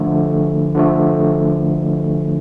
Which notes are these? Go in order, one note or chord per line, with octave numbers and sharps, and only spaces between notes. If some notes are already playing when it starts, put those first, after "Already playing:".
Already playing: D3 F3 A3
D3 F3 A3